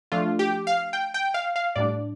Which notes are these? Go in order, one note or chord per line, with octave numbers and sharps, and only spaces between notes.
F3 A3 D4 F4
G4
F5
G5
G5
F5
F5
A2 G3 D4 D5